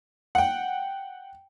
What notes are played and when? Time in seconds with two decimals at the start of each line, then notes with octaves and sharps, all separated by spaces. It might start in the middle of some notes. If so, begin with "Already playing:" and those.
0.35 F#5 G5